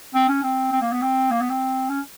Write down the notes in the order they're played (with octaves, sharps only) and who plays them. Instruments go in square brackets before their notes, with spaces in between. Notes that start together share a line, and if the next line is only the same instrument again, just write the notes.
[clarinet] C4
C#4
C4
C4
A#3
B3
C4
A#3
B3
C4
C#4